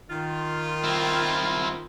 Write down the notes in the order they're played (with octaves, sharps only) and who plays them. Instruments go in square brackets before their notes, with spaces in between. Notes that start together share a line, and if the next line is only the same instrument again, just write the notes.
[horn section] D#3 F4
[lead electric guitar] C4 E4